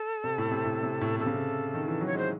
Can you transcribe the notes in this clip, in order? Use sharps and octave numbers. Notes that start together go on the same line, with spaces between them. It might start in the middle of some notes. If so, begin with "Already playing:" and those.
Already playing: A4
C3
A2
C3
A2
C3
A2
C3 A4
C#3
C3
D#3
E3
F#3
C#5
G#3 C5